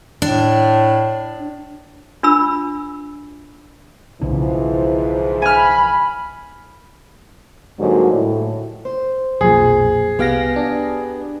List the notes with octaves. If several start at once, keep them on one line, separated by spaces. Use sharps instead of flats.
A2 D4
D4 F4 A#4 B5 E6
B1 G#2 C#3 E3 F3 D4
G#5 B5 F6
G#2 D3 F#3 G3 A#3 F#4
A2
C5
B1 F2 A#2 G#4
C2 B3 G4 F5 G5 A#6
D4